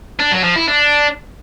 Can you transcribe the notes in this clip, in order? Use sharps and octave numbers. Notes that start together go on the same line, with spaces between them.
D4
F#3
F3
E4
D4